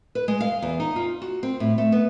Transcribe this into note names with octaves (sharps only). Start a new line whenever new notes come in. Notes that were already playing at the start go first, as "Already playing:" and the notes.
B4
G#3
F5
E2
D#4
F4
F#4
C4
A2
A3
B3